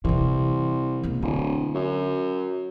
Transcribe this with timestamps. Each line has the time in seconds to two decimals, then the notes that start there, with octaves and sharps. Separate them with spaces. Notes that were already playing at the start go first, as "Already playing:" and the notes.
0.05 C2 C3 E3
1.03 E1 A#3
1.22 D1 D3
1.75 F#2